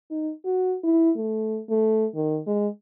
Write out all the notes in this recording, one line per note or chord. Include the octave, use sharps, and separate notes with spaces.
D#4
F#4
E4
A3
A3
D#3
G#3